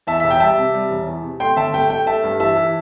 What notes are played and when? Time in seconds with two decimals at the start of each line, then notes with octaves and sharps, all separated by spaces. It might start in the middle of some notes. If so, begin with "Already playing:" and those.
0.07 E2 E5 A5
0.20 E1 E5
0.30 G5
0.40 G3 E5 A5
0.57 C3
0.74 G3
0.90 E1
1.07 E2
1.23 C3
1.40 A3 G5 C6
1.56 G1 E5 A5
1.74 A3 G5
1.90 A3 G5
2.06 A3 E5 A5
2.23 G2
2.40 E3 E5 A5
2.56 E3